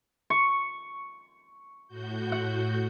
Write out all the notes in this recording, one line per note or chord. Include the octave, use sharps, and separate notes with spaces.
C#6
A2 F#4 G6
F#5